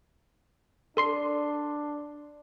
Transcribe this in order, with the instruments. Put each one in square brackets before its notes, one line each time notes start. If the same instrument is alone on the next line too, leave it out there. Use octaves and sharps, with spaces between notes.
[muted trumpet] D4 [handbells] A4 C6 C7